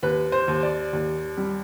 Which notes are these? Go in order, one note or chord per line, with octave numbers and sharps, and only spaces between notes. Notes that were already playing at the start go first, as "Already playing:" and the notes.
D#2 B4
C5
D#2
D5
D#2
G3